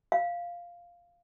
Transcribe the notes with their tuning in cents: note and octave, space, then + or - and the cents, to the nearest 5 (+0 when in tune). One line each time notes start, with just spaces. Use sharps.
F5 -5